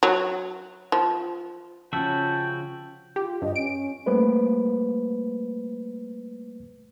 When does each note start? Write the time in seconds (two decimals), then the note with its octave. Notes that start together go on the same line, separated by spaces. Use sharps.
0.03 F#3
0.92 F3
1.93 C#3 F3 C#4 F4 F#4 E5 G5 A5
3.16 F4 G4
3.42 G2 D#5
3.56 C#4 D7
4.06 G3 A3 A#3 B4 C5